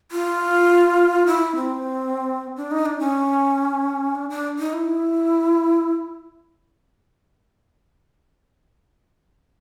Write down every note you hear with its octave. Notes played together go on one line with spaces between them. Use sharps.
F4
E4
C4
D4
D#4
D4
C#4
D4
D4
D#4
E4